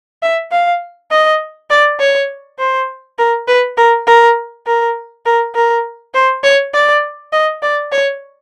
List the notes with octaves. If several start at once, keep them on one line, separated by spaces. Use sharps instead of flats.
E5
F5
D#5
D5
C#5
C5
A#4
B4
A#4
A#4
A#4
A#4
A#4
C5
C#5
D5
D#5
D5
C#5